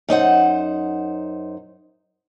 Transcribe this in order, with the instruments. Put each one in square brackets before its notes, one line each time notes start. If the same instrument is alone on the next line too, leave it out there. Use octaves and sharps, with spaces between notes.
[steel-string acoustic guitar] F#2 D#4 C5 F#5